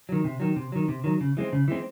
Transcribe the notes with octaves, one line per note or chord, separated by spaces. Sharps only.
D#3 F#3
C3
D#3 F#3
C3
D#3 F#3
C3
D#3 F#3
C#3
E3 G#3 C4
C#3
E3 G#3 C4